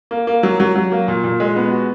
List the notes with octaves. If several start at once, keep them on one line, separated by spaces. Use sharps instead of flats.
A#3
A#3
F#3
F#3
F#3
A#3
A#2
A#2
G#3
B3
F#4